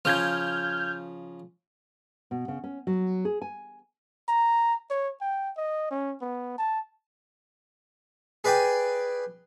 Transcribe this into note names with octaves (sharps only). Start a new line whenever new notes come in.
C#3 F3 F6 G6 G#6
B2
C#3
C#4
F#3
G#4
G#5
A#5
C#5
G5
D#5
C#4
B3
A5
G#4 B4 D5 G5 G#5